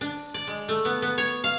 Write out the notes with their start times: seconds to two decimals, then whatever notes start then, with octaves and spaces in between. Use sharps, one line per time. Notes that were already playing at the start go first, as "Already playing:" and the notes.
0.01 D4
0.34 D5
0.47 G#3
0.68 A3
0.85 B3
1.02 B3
1.18 C#5
1.44 F5